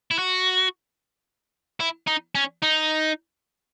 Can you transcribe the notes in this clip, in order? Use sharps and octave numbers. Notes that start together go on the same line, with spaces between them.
E4
F#4
E4
D#4
C#4
D#4